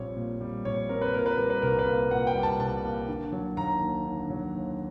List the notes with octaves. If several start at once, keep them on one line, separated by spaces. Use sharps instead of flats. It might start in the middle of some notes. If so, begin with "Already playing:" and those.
Already playing: A#1 A#2 G3 C4 C#5
A#2
G3
A#1 C#5
C4 A#4
B4
A#2 A#4
B4
G3 A#4
B4
C2 A#4
B4
A#3
A#2 F#5
G5
G3
A5
C2 A5
A#3
D3
F#3
D#2 A#5
D#2
D3
F#3
D#2